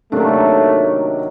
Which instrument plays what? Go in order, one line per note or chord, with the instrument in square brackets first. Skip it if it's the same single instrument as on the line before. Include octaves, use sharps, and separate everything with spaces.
[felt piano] C3 A#3 D4 [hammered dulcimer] D#3 F#3 [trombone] A3